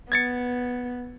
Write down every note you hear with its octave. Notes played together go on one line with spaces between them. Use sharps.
B3 G#6 A6 C#7